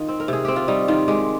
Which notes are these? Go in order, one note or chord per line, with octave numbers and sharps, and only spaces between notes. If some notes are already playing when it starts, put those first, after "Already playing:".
Already playing: D#3 D#4 F4
C4
A#4
C3 G#4
C4 G4
F4
G3 D#4
D#3 F4
G#3 G4